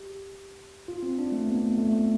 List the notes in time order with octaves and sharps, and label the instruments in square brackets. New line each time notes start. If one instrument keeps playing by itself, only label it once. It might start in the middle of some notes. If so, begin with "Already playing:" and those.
Already playing: [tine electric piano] G4
F4
C4
D4
A3
B3
A3